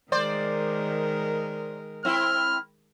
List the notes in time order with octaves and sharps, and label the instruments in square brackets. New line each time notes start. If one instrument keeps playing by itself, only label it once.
[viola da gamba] D#3 G#3 A#4 [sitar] C5 D5
[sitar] C4 E4 [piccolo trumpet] F6